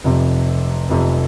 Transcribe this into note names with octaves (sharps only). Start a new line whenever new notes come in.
F1 F2 C3
F1 F2 C3